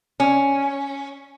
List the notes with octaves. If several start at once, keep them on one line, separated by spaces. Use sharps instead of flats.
C#4